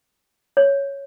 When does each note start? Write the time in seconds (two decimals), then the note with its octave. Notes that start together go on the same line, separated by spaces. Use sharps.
0.57 C#5